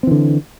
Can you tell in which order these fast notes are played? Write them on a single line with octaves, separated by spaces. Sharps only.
C4 E3 D3